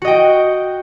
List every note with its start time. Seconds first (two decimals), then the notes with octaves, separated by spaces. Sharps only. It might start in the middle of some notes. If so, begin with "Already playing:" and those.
0.02 F#4
0.05 D#5
0.08 G5